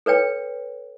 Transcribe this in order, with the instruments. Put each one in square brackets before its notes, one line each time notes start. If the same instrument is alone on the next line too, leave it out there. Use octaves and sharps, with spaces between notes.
[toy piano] A4 B4 C#5 G5